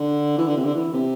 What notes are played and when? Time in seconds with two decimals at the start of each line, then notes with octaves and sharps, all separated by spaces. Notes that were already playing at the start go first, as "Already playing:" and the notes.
Already playing: D3
0.38 E3
0.47 D3
0.57 C3
0.65 D3
0.75 E3
0.93 C3